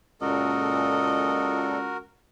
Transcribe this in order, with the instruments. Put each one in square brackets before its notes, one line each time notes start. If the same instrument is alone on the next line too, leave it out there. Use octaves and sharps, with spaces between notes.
[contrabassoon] C#2 [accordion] A#2 A4 [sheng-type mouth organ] F#4 A#4 [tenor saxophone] D#5